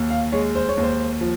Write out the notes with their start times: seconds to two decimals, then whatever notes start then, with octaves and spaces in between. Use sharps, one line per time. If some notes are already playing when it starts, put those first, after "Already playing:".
Already playing: D#2
0.10 F5
0.32 G#3 C#5
0.55 C5
0.68 C#5
0.77 D#2
0.83 C5
1.21 F3